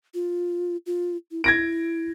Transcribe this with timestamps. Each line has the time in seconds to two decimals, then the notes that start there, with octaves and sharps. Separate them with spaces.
0.14 F4
0.86 F4
1.31 E4
1.44 E4 G#6 A#6 D7